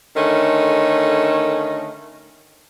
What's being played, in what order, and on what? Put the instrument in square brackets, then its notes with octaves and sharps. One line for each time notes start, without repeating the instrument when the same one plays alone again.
[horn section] D3 D#3 A3 C#4